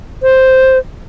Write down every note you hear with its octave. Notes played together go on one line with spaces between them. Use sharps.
C5